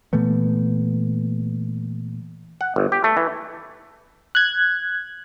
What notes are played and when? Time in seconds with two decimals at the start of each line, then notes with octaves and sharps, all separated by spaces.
0.13 A#2 E3 A3 B3
2.61 F#5
2.76 G1
2.92 G4
3.04 A3
3.17 E3
4.35 F#6 G#6